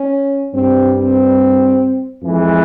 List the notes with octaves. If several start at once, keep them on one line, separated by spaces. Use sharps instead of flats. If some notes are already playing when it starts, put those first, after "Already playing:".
Already playing: C#4
G2 G3 C4
C4
F2 E3 G#3